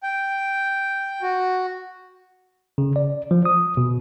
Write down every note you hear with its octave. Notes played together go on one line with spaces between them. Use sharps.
G5
F#4
C#3
D5
F3
D#6
B2